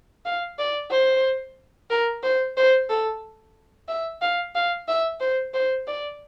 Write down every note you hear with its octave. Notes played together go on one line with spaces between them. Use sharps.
F5
D5
C5
A#4
C5
C5
A4
E5
F5
F5
E5
C5
C5
D5